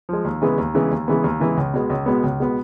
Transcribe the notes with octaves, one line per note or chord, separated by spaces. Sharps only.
F3 G#3
D#2
C#3 E3 G#3 B3
D#2
C#3 E3 G#3 B3
D#2
C#3 E3 G#3 B3
D#2
C#3 E3 G#3 B3
C#2
B2 G#3 B3
C#2
B2 G#3 B3
C#2
B2 G#3 B3